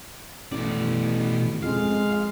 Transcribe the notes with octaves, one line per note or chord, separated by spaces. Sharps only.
A1 B2 D5
F2 G#3 F5